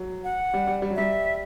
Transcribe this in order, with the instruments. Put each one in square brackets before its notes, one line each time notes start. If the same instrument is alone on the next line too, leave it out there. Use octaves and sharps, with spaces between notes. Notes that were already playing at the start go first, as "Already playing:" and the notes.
Already playing: [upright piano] F#3
[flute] F#5
[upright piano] G3
G3
G3
F#3
[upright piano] G3 [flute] E5